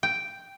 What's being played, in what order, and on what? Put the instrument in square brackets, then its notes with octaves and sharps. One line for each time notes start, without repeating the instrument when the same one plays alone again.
[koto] G5